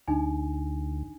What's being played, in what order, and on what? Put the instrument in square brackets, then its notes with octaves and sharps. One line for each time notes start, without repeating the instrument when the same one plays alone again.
[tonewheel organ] D2 [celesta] D4 D#4 G#5